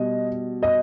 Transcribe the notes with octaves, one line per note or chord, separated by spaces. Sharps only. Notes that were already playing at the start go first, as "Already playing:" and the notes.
Already playing: B2 G3 D#5
D#5